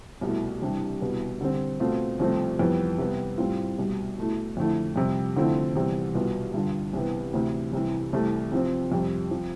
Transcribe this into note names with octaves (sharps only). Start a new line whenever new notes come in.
C2 B2 A3 E4
C2 C3 E3 G3 D4
C2 B2 B3 E4
D3 G3 C4
B2 A3 C4 F4
C2 C3 F3 A3 C4
F2 E3 G3 B3
C3 G3 B3
A2 G3 C4 F4
C2 B2 G3
B2 A3 E4
F2 D3 A3 E4
F2 C3 G3
D3 F3 A3 C4 E4
E2 C3 G3 C4
C2 B2 B3 F4
G2 D3 G3 D4 F4
C2 C3 E3 B3
D2 C3 E3
C2 C3 E3
C2 C3 E3 A3
C3 F3 C4
F2 C3 G3
F3 C4